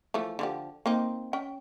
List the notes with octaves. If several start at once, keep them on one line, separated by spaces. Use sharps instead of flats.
E3 F3 A3
D3 F3 G4
A#3 C4 D#4
C#4 G5